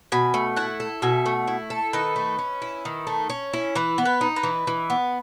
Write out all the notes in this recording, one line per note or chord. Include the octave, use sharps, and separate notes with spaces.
B2 G#5 B5
A3
E4 F#5 A5
A4
B2 E5 G#5
A3
E4
A4
D#3 B4 D#5
A3
C#4
E4
D#3
A3
C#4
E4
E3 B4
B3
B4
D#4
B4 D#5
E3
E3
B3